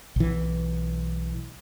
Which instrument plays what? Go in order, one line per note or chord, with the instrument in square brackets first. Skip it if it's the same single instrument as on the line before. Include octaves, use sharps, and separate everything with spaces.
[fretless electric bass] B1 E3